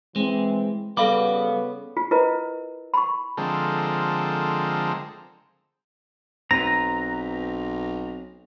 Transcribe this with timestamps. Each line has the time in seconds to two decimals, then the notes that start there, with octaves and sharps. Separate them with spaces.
0.16 E3 G#3 C4
0.97 C#3 G3 B3 A4 F5 B5 D6
1.97 F4
2.11 E4 F4 A#4 B4 D#5
2.94 B5 C#6
3.37 D3 F3 G#3 C4 A4 A#4
6.51 B1 C4 B4 A#5 A#6